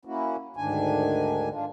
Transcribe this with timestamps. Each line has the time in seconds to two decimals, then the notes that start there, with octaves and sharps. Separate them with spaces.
0.05 A#3 C#4 E4 F#4
0.57 D2 G#2 D#3 D4 G#5
1.51 D4 F4